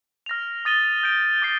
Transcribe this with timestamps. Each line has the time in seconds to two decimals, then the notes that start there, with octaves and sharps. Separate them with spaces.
0.26 F6 A#6 F7
0.65 D#6 A6 D#7 G7
1.03 G6 D7 G7
1.42 D6 A6 C7